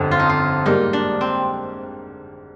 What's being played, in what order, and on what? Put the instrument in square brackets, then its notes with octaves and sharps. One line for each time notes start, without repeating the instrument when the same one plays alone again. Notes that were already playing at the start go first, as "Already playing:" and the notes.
Already playing: [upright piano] G1 F2 D3
[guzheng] F4
D#4
F4
[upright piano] G#2 G3 A#3 [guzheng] D#4
[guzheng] D4
C4